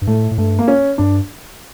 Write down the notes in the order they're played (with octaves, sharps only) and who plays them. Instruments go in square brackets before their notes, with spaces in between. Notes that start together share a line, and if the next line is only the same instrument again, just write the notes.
[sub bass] G2
[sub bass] A2 [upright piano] A3
[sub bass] A2
[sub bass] G2 [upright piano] A3
[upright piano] A#3
C#4
[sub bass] G2 [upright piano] D4